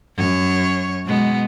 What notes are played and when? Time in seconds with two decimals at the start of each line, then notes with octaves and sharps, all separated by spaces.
0.16 F#2 C#5
1.05 B2 G#3 B3